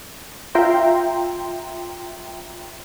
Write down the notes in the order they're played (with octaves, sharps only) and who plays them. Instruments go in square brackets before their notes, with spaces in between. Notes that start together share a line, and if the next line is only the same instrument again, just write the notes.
[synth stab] F4 E5 G5 A#5 C6